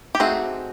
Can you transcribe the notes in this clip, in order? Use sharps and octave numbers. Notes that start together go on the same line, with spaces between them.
G4
A3 C4 D#4 F#4 G#4